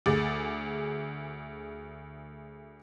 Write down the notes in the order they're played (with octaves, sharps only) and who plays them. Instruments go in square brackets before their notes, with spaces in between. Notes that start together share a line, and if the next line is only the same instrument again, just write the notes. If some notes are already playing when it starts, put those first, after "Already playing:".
[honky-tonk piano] D2 G#4 D6 A6